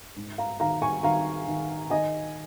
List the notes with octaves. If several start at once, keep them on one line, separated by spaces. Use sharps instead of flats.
G#2
F5 A#5
D#3 F5 A#5
G#5 C#6
D#3 F5 A#5
D#3
D#3 D#5 G#5